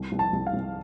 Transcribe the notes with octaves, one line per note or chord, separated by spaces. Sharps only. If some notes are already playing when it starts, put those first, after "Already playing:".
Already playing: C2
C2
A5
C2
F5
C2